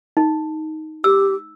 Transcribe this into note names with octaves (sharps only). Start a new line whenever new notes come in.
D#4
G4 E6